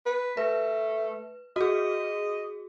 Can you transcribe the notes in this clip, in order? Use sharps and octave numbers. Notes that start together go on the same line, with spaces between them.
B4
A3 B4
F#4 G#4 D#5